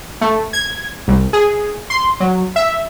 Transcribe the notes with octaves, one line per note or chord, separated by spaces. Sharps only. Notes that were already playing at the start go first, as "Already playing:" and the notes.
A3
G#6
C2
G#4
C6
F#3
E5